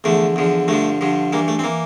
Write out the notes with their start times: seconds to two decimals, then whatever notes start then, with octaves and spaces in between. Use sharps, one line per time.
0.04 E2 D3 F3 A3
0.36 E2 D3 F3
0.68 G2 D3 F3 A3
1.01 G2 D3 F3
1.33 G2 E3 A#3
1.48 A3
1.59 C4
1.64 E3 A#3